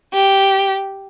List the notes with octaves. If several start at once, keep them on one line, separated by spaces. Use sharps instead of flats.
G4